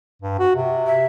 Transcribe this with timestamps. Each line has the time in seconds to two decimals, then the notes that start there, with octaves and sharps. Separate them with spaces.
0.22 G2
0.39 F#4
0.56 C3
0.87 E5